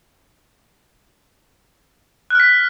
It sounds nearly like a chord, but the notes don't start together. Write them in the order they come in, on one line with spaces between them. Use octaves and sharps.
F#6 F6 B6